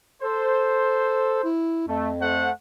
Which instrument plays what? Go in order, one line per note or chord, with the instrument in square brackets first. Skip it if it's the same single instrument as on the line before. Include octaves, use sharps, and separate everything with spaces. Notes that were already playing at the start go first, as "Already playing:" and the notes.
[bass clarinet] A4 [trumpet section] C5
[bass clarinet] E4
[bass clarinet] F2 [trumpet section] A3
[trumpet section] A3 C5 F#5